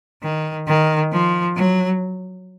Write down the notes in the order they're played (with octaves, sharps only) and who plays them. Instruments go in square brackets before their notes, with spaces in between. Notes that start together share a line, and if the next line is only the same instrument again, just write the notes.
[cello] D#3
D#3
F3
F#3